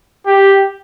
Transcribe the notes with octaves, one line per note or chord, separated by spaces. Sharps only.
G4